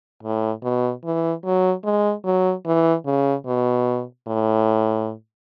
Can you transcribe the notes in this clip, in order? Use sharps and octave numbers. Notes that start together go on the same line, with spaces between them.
A2
B2
E3
F#3
G#3
F#3
E3
C#3
B2
A2